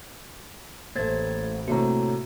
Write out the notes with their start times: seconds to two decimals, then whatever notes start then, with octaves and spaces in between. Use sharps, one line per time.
0.96 A1 A3 A#3 C5 G#6 A6
1.68 A2 C3 A3 A#3 F#4 C#5 A#5